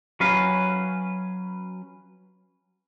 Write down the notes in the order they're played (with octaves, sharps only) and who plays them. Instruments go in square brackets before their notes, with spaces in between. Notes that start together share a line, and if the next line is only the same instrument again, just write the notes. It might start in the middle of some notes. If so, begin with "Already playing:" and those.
[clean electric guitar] F#3 C#4 B4 F5